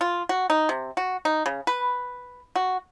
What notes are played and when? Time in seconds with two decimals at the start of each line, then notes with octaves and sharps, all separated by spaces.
0.01 F4
0.29 F#4
0.50 D#4
0.69 C3
0.97 F#4
1.25 D#4
1.46 C#3
1.67 B4
2.56 F#4